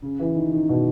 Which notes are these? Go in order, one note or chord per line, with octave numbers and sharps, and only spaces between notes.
C#3
E3
D#3
D#3
B2